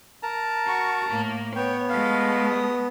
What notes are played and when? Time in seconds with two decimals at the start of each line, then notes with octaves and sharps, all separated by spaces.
0.23 A#4 A5 A#5
0.65 F#4 C#6
1.09 A2 A#3
1.56 B3 C#5 G5
1.90 G#3 A3 F5
2.51 D#6